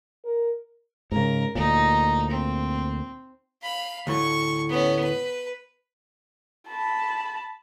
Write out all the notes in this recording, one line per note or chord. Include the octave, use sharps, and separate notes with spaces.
A#4
G#2 C#3 A#4
D2 A#2 D#4
C4
F5 B5
D2 A2 C#6
B3 C#4
B4
A5 B5